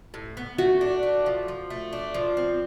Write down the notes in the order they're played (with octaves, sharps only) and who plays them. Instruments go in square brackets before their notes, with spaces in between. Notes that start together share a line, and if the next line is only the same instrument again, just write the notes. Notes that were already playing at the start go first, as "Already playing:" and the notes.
[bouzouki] A2
B3
[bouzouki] A3 [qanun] F#4
[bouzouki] D4
A3
F3
F3
A3
D4
F3
C4